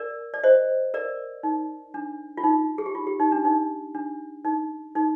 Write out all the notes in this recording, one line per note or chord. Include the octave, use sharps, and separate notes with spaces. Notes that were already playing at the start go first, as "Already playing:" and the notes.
Already playing: A#4 D5
D5
C5 D#5
A#4 D5
D#4
D4
F4
D#4
G#4
G4
F4
G4
D#4
D4
D#4
D4
D#4
D#4